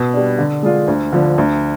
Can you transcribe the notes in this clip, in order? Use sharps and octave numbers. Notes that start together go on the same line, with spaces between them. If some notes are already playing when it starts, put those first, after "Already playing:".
Already playing: B2
G3 D4
D3
G#3 D4 F4
D2
D3 F3
D2